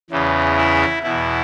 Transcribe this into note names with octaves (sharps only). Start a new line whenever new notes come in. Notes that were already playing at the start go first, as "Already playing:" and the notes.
E2 C#3 E3
E4
E2 B2 E4